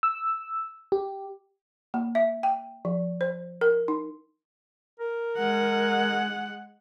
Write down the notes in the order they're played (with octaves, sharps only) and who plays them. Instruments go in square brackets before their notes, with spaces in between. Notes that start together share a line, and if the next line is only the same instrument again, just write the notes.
[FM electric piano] E6
G4
[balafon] A#3
E5
G5
F3
C5
A#4
D#4
[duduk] A#4
[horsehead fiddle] G#3 F#5